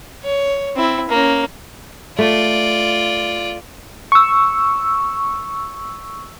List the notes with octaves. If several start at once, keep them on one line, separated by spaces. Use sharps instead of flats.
C#5
C4 E4
A#3 C#4
A3 F4 D5
C#6 E6